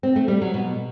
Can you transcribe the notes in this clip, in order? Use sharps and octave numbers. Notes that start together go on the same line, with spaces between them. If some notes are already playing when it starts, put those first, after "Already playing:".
C4
A3
G3
F#3
B2